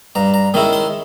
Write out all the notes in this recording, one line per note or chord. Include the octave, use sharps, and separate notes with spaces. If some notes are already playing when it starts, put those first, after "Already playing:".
G2 A#5
A#5
D#3 G#3 C#4 E4
C6